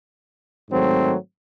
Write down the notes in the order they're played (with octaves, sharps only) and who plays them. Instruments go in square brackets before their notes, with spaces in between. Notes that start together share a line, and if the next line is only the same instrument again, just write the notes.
[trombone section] G#2 D#3 F#3 A3 C4